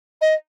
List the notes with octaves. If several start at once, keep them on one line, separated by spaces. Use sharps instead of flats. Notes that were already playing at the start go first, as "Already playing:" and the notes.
D#5